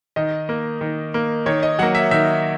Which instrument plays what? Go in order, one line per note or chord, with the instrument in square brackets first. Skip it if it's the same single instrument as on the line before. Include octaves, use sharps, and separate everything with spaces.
[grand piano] D#3 D#5
A#3
D#3
A#3
D#3 C#5
D#5
F#3 A#3 F#5
E5
D#3 E5